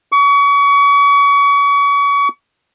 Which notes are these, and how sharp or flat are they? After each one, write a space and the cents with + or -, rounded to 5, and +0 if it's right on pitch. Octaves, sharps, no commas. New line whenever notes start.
C#6 +35